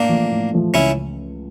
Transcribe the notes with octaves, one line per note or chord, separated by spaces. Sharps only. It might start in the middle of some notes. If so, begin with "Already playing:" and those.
Already playing: A2 A#3 D4
F3 A3
A2
F3 A3
C#2 C#4 E4